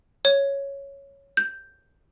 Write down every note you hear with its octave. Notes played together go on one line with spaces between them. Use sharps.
C#5
G6